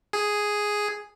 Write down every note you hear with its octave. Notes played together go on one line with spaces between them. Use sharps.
G#4